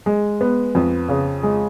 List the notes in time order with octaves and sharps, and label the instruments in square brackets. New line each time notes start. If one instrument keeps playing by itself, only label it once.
[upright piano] G#3
B3
F2
C#3
G#3